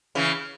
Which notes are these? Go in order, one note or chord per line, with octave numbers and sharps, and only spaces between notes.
C#3 E3